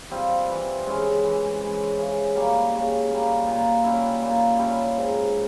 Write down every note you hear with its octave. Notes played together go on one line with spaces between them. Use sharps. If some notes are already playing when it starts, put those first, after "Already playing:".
G3 C4 F4
E3
G#3 C#4 E4
E3
G#3 C#4 E4
C#3
G3 A#3 C#4
C#3
G3 A#3 C#4
A#2
G3 C#4 E4
A#2
G3 C#4 E4
G#2